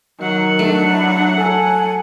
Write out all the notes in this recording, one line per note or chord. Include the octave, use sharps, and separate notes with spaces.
D#3 F#3 F#5
A3 D4
E4
A4 G#5